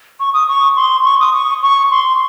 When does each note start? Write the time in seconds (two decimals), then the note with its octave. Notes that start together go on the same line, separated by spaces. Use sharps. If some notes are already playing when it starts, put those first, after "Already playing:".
0.20 C#6
0.34 D#6
0.48 C#6
0.77 C6
1.05 C#6
1.20 D#6
1.34 C#6
1.63 C#6
1.91 C6